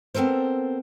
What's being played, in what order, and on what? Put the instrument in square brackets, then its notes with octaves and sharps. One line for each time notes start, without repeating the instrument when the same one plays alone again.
[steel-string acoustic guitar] B3 C4 A4 A#4 C5